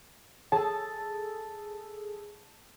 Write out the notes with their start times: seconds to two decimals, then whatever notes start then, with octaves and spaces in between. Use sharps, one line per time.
0.52 G#4 A4 A5